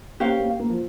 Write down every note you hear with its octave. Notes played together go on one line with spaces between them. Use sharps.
A#3 C#4 G4 C5 F5
A#3
A#3
F3